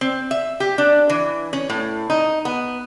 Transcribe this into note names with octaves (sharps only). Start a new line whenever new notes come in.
C4
E5
G4
D4
E3
C#4
A2
D#4
B3